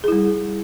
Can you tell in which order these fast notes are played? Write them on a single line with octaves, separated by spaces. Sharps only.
G#4 E4 G3